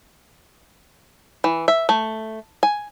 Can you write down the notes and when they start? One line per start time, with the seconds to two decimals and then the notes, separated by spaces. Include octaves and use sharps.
1.44 E3
1.68 E5
1.89 A3
2.63 G#5